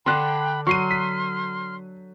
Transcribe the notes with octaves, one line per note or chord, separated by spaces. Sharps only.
D3 D4 G5 B5 C6 F#6
F#3 C6 C#6 F6 C7 D#7
B6